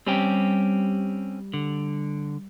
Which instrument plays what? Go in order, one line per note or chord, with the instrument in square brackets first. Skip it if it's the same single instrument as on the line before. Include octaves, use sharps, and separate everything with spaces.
[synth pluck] G3 [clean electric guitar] C4 C#4 G4
[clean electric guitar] D3